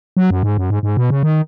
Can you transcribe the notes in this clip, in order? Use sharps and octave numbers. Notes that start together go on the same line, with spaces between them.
F#3
F#2
G#2
F#2
G#2
G#2
B2
C#3
D#3